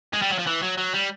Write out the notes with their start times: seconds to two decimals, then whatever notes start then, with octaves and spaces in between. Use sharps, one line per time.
0.13 G#3
0.22 G3
0.30 F#3
0.39 F3
0.47 E3
0.63 F#3
0.78 F#3
0.94 G3